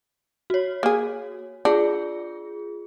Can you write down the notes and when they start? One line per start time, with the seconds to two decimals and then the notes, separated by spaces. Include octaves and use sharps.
0.50 F#4 C#5
0.83 A#3 G#4
1.65 D4 F4 G#4